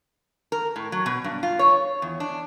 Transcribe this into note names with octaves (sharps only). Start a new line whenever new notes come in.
A#4
A2
F#3
B2
G2
F4
C#5
E2
D4